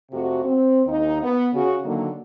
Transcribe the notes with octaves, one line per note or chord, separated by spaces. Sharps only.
F2 C3 A3 F#4
C4
D#2 D#4
B3
C#3 F#4
D3 D#3 F#3 A#3